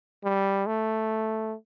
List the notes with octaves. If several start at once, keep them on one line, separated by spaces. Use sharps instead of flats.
G3
A3